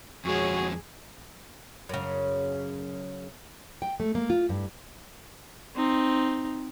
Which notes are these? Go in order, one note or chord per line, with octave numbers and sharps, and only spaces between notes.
F2 G#3 F#4 G#4 C#5
F#2 C#3
G5
A3
A#3
F4
G2
C4 D#4